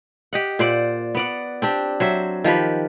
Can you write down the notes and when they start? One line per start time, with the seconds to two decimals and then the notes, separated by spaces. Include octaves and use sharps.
0.33 G4 D#5 F#5
0.59 A#2 C5 D5 F#5
1.15 B3 D5 F#5
1.62 C4 D4 G4
2.00 F#3 C5 E5
2.44 D#3 F3 G4 B4